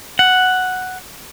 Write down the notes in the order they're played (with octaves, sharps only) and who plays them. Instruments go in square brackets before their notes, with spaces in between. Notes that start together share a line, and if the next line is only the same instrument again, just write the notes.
[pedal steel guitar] F#5